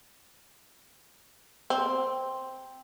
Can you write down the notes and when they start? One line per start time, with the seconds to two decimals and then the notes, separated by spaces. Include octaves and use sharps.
1.70 C4